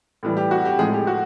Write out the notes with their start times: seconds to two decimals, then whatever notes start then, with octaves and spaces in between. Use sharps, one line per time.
0.23 A2 E3 G3
0.37 G4
0.51 F#4
0.65 G4
0.79 A2 F3 G#3 G#4
0.93 G4
1.07 F#4